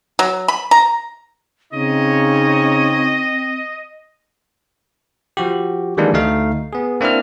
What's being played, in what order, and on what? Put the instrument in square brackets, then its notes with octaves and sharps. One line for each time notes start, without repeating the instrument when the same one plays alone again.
[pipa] F#3
B5
A#5
[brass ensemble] C#3 D#4 C#5 [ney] C4 [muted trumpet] D#5
[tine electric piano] F3 F#4 G4
D#3 E3 G3 G#3 A#3 D4
D2 A3 D#4 F5
B3 G#4
A#3 C4 D4 E4 F6